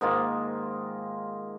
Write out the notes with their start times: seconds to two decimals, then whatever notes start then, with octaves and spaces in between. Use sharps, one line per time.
0.01 G#2 D#3 A#3 F4